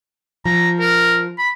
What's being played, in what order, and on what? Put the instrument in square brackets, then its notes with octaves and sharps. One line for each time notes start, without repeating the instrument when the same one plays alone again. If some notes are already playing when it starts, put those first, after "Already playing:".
[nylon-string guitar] F3 [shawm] A#5
[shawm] A#4
B5